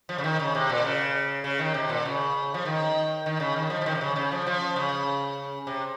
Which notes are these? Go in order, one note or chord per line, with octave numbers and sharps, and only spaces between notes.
F3
C#3
D#3
C#3
C3
A#2
C#3
C#3
D#3
C3
A#2
C#3
F3
D#3
D#3
C#3
D#3
F3
F3
D#3
C3
C#3
C#3
F3
F3
C#3
C3